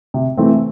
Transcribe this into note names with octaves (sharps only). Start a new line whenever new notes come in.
C3
E3 A3 C4